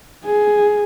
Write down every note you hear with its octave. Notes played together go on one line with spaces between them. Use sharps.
G#4